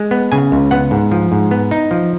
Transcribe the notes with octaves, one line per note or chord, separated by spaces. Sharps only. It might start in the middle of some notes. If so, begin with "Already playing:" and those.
Already playing: G#3
B3
C#3 G#5
C#2
B3 F#5
G#2
F3
G#2
B3
D#4
F3